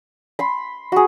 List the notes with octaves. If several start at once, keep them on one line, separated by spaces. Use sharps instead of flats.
B5 C6
F#4 G#4